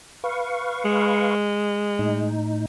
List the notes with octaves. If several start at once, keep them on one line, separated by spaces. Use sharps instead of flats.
B4 F5 C#6
G#3
A2 D#4